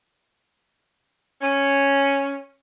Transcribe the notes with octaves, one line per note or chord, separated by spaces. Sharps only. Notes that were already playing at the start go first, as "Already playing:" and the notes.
C#4